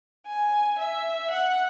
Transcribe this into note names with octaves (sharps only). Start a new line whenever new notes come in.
G#5
E5
F#5